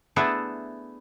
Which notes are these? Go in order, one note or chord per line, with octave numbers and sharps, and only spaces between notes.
A3 B3 D4 E4 G#4 A4